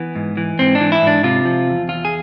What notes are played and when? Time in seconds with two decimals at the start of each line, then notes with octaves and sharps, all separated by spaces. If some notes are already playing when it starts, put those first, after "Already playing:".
Already playing: E3 B3
0.15 G#2
0.37 E3
0.59 G#2 C4
0.75 D4
0.80 E3
0.92 E4
1.02 G#2 D4
1.23 C3 F4
1.45 F3
1.67 E2
1.88 E2 F4
2.05 G#4